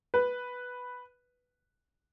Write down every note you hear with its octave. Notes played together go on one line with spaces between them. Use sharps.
B4